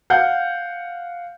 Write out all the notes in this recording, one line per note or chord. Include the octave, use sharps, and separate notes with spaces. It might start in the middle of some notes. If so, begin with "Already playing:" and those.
F5 F#5 G6